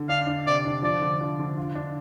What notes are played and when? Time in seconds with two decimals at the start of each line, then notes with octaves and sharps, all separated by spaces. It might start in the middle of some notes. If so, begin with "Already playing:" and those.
Already playing: D3
0.09 D4 F5
0.27 D4
0.46 C3 D5
0.65 D4
0.82 F3 D5
1.02 D3
1.21 F3
1.39 D3
1.57 F4
1.75 D4